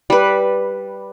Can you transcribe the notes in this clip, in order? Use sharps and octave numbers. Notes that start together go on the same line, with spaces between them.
G3 B4